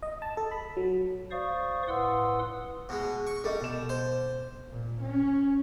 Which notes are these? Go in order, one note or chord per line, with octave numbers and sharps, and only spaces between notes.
D#5
A5
A4
B5
F#3
C5 D5 F5 C#6 D#6
A2 B4 F#5 C6 D#6 E6
B2 G#3
C#6
G3 A4 D#5
B2 E7
C5
A#2
C#4